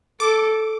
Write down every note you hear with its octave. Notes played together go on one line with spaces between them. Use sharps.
A4 D6